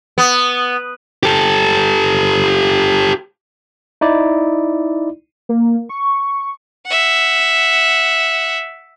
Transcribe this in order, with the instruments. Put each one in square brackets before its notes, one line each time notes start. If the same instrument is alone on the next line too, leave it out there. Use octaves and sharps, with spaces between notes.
[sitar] B3
[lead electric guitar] G4 A4
[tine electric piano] D#4 E4 D5
[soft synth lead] A#3
C#6
[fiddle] E5 F#5